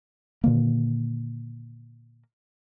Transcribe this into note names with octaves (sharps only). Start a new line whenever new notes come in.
A#2 D3 D#3 A#3